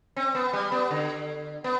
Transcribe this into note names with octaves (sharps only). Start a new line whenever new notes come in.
C4
B3
G3
B3
D3
B3